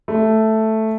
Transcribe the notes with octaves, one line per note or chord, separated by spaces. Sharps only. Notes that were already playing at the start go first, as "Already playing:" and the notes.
A3